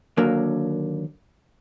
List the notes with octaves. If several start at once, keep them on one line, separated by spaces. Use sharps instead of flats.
D#2 D3 F#3 A#3